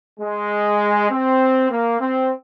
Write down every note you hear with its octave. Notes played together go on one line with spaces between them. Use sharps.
G#3
C4
A#3
C4